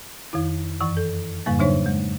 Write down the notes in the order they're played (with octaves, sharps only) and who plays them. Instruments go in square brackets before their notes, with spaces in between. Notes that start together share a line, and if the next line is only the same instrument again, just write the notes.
[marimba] F2 D#3 E4
F#2 E3 C#6
A4
F2 G#2 C#3 G3 A#3
C#3 F#3 D4 D#4 C5 C#5
G#3